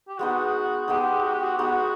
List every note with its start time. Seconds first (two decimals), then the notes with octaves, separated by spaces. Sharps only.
0.08 G4
0.18 G#3 B3 D#4 F#4
0.88 G#3 B3 D#4 G4
1.23 F#4
1.34 G4
1.44 F#4
1.58 G#3 B3 D#4 F#4